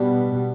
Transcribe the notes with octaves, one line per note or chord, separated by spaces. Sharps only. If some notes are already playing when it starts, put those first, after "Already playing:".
Already playing: B2 G3 B3 D4